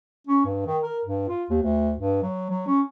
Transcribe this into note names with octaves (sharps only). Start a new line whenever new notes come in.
C#4
G2
D#3
A#4
G2
F4
D#2
D2
G2
F#3
F#3
C#4